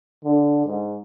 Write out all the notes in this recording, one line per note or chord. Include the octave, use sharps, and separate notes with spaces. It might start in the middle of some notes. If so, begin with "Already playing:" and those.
D3
G#2